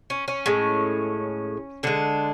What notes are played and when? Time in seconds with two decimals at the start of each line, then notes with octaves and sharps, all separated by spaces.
0.10 C#4
0.28 C#4
0.46 A2 G#3
1.83 D3 G#3 D4